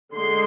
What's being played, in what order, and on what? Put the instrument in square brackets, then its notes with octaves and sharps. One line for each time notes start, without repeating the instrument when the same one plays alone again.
[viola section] D3 G#3 C6